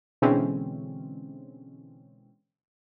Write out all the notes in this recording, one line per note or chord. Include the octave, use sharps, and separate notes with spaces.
B2 D3 E3 G#3 C4 C#4